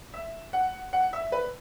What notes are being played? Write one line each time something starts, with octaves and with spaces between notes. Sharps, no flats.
E5
F#5
F#5
E5
B4